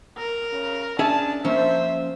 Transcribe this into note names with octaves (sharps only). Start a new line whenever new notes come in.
A#4
C#3
C#4 D4 G#4 E5 A5
F3 A#3 C#4 C5 E5